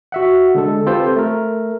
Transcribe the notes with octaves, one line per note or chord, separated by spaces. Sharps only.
F#4 E5 F#5
D3 G#3 A4
C4 F4 G4 A4 B4 C5
A3 A#4